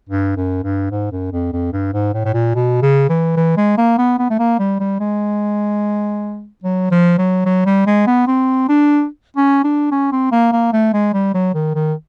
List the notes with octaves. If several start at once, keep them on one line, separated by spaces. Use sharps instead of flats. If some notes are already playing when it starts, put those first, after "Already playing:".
G2
F#2
G2
G#2
F#2
F2
F2
G2
G#2
A2
A2
A#2
B2
C#3
E3
E3
G#3
A#3
B3
B3
A3
A#3
G3
G3
G#3
F#3
F3
F#3
F#3
G3
G#3
B3
C4
D4
C#4
D4
C#4
C4
A#3
A#3
A3
G#3
G3
F#3
D#3
D#3